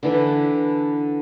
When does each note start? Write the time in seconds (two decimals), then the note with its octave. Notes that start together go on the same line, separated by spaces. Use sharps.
0.03 D3 E3 B4